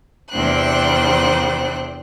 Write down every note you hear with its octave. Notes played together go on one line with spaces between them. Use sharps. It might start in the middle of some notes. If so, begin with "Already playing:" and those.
E2 C3 D4 C5 G5 F#6